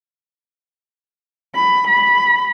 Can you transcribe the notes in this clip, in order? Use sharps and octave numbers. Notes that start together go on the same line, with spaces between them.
B5
B5